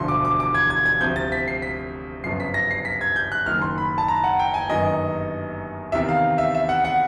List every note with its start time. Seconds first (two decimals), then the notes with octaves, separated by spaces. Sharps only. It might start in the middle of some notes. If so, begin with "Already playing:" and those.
Already playing: E1 D2 D3 F3 C6
0.08 D6
0.25 D6
0.40 D6
0.54 G#6
0.70 G#6
0.86 G#6
1.00 D2 C3 F3 G6
1.16 A6
1.32 B6
1.48 C7
1.62 B6
2.24 G1 F#2 C#3 F3 C7
2.40 B6
2.54 A#6
2.71 C7
2.85 B6
3.01 G#6
3.16 G6
3.32 F#6
3.46 F#1 F#2 D#3 F6
3.62 C6
3.78 B5
3.98 A5
4.08 A#5
4.24 F#5
4.39 G5
4.54 G#5
4.69 G1 F#2 D#3 D#5
5.92 E2 C3 D#3 E5
6.09 F5
6.38 E5
6.55 E5
6.69 F#5
6.85 F#5